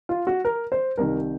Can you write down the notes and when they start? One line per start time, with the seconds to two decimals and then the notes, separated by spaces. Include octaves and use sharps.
0.09 F4
0.27 F#4
0.45 A#4
0.72 C5
0.97 C2 C3 D#3 A#4